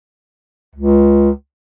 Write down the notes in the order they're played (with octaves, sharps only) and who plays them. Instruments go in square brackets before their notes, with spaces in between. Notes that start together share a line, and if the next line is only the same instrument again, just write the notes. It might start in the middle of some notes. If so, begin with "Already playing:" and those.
[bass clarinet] C#2